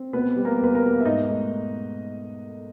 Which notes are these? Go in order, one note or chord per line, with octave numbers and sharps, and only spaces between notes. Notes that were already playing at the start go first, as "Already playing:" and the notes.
Already playing: C4
B2 B3 B4
G3
A#3 A#4
E2 B4
A#3 A#4
B2
E5
G#2 D#4 D#5
A3